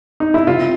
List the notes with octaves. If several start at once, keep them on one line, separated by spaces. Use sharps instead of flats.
D#4
E4
C3 F4